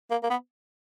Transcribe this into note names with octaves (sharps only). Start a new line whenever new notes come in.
A#3
A#3
B3